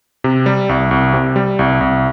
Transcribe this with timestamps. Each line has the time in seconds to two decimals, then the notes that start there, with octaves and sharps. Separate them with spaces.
0.24 C3
0.46 G3
0.69 C2
0.91 C2
1.13 C3
1.36 G3
1.59 C2
1.81 C2